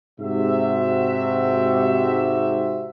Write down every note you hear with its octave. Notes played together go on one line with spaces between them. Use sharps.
G#2 C3 F#4 E5